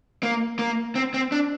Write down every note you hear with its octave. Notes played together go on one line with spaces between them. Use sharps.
A#3
A#3
C4
C4
D4